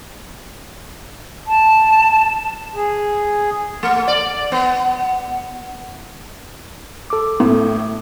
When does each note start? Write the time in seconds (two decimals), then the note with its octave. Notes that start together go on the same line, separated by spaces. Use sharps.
1.47 A5
2.74 G#4
3.83 A3
4.08 D5
4.52 B3
7.10 A4 D6
7.40 A2